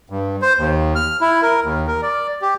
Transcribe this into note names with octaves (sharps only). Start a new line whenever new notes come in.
G2
C5
D#2
F6
E4
A#4
D#2
A#4
D5
G4